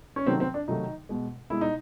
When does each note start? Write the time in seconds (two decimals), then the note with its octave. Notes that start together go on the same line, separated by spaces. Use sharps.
0.16 C#4
0.26 C3 D#3 F#3 A3 C4
0.40 C4
0.54 D4
0.68 C3 D#3 F#3 A3 D#4
1.09 B2 G#3
1.50 B2 G#3 E4
1.61 D#4